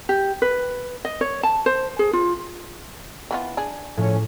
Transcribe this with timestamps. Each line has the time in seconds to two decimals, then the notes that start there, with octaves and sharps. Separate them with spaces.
0.09 G4
0.42 B4
1.05 D#5
1.21 C#5
1.43 A5
1.66 C5
1.99 G#4
2.13 F4
3.31 E3 B3 F4
3.57 D4 G#4
3.97 A2 F3 A3 C#4